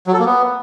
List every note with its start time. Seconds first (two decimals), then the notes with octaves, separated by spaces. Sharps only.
0.07 F#3
0.13 A4
0.19 A#3
0.26 B3